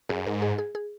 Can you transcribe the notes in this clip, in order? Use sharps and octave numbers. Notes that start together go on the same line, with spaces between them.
F#2 G#4
G#2 A#4
G#4
G#4
G#4